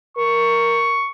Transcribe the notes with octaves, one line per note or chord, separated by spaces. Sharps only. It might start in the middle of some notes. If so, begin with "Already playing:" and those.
A#4 C#6